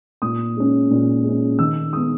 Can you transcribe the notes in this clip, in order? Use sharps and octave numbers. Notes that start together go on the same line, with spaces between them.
A#2 D#6
G#3 C#4
A#2
G#3 C#4
D#3 E6
G#3 B3 D#6